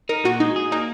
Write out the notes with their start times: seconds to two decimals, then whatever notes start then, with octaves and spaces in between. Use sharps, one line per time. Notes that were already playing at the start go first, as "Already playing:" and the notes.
0.09 D#4 A#4
0.24 A#2 F#4
0.40 G#3 D#4
0.56 G#4
0.72 A#3 D#4